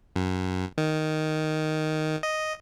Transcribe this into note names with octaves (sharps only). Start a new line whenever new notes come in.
F#2
D#3
D#5